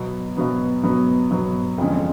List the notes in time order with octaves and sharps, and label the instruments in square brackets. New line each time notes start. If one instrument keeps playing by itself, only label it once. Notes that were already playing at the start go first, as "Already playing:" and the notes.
Already playing: [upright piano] B2 F#3 B3
B2 F#3 B3
B2 F#3 B3
B2 F#3 B3
F2 D3 F3 G#3 C#4